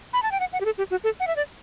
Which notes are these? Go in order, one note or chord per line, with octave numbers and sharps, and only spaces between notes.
B5
A5
G5
F#5
F#5
G4
A4
G4
F#4
A4
F#5
E5
D5